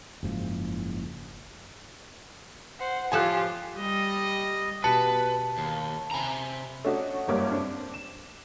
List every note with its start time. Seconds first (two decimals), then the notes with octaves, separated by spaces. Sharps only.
0.23 F#1 G#2 F3
2.79 C5 F#5
3.12 A2 F3 F4 G4 A4 G#5 F#6
3.79 G3 D#5
4.84 B2 G4 B4 A5 C#7
5.58 D#2
6.11 C3 G#5 A#5 B5
6.85 A3 C#4 D4 F#4 D#5
7.28 F#1 G2 G3 A#3 C#5 D6
7.51 C4 D4
7.94 E7